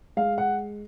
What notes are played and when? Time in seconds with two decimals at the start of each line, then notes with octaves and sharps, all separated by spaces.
0.17 G#3 F5
0.38 F#5